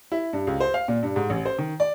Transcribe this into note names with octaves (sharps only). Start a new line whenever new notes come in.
E4
G2
C#2
C5
F5
A#2
G2
G#2
A1
C5
D#3
D5